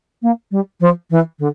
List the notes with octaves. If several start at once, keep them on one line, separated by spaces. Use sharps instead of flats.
A#3
G3
F3
E3
D3